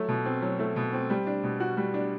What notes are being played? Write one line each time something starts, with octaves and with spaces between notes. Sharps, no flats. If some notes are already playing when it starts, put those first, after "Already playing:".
Already playing: F#3 A3
B2
C4
F#3
A3
B2
C4
G3
D4
B2
F#4
G3
D4